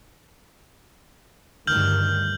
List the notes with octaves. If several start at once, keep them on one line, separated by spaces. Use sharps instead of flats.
D2 G2 D#3 F6 G6 F#7